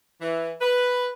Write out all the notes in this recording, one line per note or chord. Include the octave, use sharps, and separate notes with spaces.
E3
B4